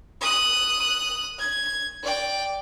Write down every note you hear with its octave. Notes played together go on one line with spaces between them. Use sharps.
D#6 F#6
G#6
D5 G5